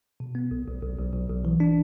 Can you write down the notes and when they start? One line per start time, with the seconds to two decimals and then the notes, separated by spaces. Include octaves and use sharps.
0.20 B2
0.35 B3
0.51 B1
0.67 B1
0.82 B1
0.98 B1
1.13 B1
1.29 B1
1.45 E3
1.60 D4